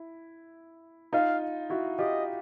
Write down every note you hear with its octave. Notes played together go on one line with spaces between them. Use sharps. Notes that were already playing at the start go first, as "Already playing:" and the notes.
Already playing: E4
D#4 F4 F5
E4 F#4
F4 G4 D#5